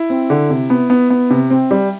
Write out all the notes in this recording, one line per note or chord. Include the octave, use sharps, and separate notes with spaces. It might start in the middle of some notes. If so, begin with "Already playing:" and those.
Already playing: E4
C4
D3
C3
B3
B3
B3
C3
C4
G3